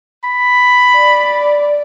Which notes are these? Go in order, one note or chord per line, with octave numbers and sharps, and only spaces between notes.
B5
D5